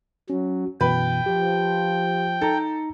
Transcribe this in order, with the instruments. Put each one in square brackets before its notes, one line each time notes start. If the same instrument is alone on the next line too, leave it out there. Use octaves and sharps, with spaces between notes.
[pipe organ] F#3 [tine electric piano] C#4
[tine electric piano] F#2 B2 E3 [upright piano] B4 B5 [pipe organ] G5
[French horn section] F3 [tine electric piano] G4
[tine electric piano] D#4 A#5 [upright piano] A4